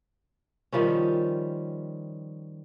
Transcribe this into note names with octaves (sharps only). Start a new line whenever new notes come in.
D#3 F3 G3 C#4